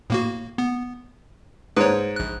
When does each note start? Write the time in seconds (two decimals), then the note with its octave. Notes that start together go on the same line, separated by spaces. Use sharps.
0.10 A2 A#3 F#4
0.58 B3
1.76 G#2 B4 C#5
2.16 A#1 F#6